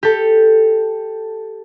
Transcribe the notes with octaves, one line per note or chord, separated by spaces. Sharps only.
G4 A4